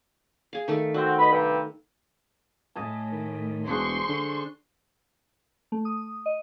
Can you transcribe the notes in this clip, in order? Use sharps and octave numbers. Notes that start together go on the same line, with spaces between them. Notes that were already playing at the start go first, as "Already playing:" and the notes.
G#4 F5
D#3 A3 A4
D3 C4 F#4
B4 D#5 B5
G2 C3
A2 D#5 G#5 A5
D#3
E1 D4 G#4 C5 C6 C#6
D3
A3
D#6
D#5